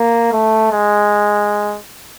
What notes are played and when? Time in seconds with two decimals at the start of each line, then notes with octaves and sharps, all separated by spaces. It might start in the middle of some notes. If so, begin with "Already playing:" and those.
Already playing: A#3
0.32 A3
0.72 G#3